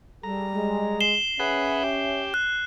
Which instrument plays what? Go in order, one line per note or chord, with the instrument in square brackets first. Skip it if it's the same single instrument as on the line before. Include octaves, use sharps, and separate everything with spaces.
[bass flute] G3 [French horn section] G#4 A4 [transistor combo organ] A#5
[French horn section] G#3
[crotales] C7 E7 G7
[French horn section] C#4 [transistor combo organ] G#4 B4 F#5 [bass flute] E5
[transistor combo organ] G4
[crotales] F#6